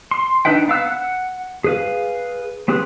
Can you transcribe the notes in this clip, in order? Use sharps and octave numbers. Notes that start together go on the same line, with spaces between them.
C6
D4 D#4 B4 E5 G5
B3 F5 E6 F#6
F#5
G#4 B4 F5
B3 C4 G4 G#4 B4